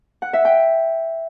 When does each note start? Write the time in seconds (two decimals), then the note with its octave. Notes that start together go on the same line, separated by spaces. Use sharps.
0.22 F#5
0.33 E5
0.45 G5